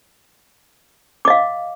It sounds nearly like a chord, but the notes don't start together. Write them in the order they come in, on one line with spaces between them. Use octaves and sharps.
D6 D#5 F5